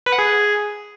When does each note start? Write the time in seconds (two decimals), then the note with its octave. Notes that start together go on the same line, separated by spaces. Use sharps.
0.06 B4
0.12 F#5
0.19 G#4